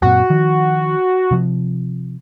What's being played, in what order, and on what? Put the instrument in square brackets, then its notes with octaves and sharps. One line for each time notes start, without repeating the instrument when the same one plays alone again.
[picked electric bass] F#2 A#2 C4 [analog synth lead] F#4
[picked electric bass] D#3 F3
C3 F3